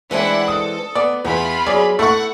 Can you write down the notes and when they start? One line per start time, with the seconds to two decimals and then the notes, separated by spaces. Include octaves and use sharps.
0.11 E3 G#3 C4 D4 E4 F#5
0.48 A4 D#6
0.95 B3 D5
1.25 E2 B3 E4 F4 B5
1.66 F#3 G#4 D5
1.99 A3 E4 A4 F#5 C#6